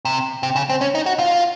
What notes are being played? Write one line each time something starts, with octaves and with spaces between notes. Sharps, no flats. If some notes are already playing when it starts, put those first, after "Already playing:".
C3
C3
C#3
C4
C#4
D#4
F#4
F4